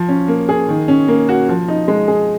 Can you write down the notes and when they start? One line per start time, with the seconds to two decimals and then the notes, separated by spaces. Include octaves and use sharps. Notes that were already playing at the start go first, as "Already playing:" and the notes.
Already playing: F3
0.08 C#4
0.28 A#3
0.49 G#4
0.69 D#3
0.88 C#4
1.08 A#3
1.29 F#4
1.49 F3
1.68 D#4
1.88 G#3
2.08 G#4